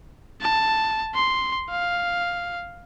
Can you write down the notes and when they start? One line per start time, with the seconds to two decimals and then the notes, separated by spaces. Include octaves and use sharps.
0.41 A5
1.15 C6
1.70 F5